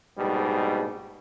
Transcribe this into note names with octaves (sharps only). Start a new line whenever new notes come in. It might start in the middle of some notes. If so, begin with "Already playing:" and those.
A#1 G#2 B2 G3